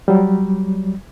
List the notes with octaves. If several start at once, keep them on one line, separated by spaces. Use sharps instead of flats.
F#3 G3